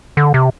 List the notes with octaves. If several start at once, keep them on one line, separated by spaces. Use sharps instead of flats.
D3
C3